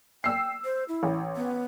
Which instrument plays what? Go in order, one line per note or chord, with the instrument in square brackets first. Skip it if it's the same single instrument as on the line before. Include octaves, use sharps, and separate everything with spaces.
[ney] G5 [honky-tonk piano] E6 C7
[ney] C5
E4
[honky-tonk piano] A1
[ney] B3